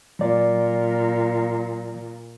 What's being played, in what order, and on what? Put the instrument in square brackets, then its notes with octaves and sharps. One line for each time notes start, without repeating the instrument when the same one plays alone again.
[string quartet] A#2 [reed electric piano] F#3 D5